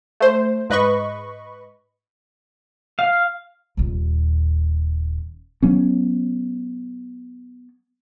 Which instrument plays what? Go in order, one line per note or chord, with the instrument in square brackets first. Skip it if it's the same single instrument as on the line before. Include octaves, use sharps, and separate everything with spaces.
[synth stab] A3 C5
G#2 B4 D#5 B5 C#6
[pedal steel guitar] F5
[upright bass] D#1 D#2
[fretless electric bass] F#3 B3 C#4